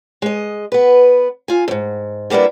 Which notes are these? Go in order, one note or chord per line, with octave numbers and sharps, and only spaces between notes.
G#3 D#5
B3 B4
F4 G#5
F2 G#2
G3 A#3 B3 D4 E4